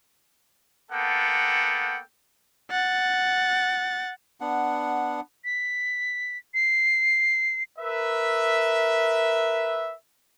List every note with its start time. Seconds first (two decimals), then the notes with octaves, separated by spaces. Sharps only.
0.91 A#3 B3 A4 F#5 G5 A5
2.71 F#5 A6
4.41 B3 D4 F#5
5.45 B6
6.54 C7
7.79 A#4 B4 E5